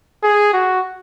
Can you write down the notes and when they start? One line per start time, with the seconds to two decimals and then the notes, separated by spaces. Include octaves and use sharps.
0.23 G#4
0.53 F#4